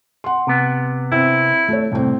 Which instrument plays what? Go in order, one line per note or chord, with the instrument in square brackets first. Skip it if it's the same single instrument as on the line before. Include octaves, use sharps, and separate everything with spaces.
[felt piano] F#5 C6
[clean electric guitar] C3 B3
[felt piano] C4 [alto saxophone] E4
[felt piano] A3 C#5
[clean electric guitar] C2 [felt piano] A2 C4